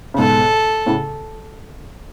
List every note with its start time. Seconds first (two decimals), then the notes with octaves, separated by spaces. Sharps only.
0.14 C#3
0.19 G#2 B2 A4
0.86 A2 C#3